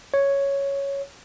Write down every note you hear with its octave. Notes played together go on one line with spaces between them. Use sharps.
C#5